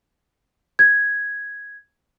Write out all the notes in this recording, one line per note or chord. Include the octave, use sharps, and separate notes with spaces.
G#6